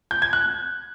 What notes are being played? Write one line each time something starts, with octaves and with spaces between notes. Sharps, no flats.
G6
G#6
F#6